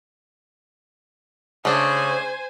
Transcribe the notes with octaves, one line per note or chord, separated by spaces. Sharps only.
C#3 A3 D4 C5 G#5